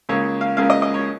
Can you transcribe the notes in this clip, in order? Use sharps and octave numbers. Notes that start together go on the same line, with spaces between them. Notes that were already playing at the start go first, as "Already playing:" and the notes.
C#2 C#3 A#3 C#5
F5
C#2 C#3 A#3 F5
D#5
D#5
C#5